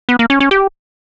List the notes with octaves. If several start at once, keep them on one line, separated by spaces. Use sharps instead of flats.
B3
A#3
C#4
C#4
G4